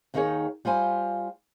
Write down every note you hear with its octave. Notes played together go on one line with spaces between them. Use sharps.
D#2 D#3 D#4 F#4 G#4 C#5
G3 F4 C5 G#5